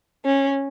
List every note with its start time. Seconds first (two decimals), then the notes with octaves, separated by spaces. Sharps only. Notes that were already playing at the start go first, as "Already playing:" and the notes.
0.25 C#4